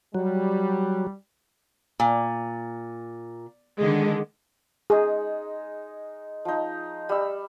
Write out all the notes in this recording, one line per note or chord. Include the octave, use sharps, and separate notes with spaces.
F#3 G3
A#2
D3 D#3 G#3
G#3 D#4 G#4
F3 D#4
G3 E6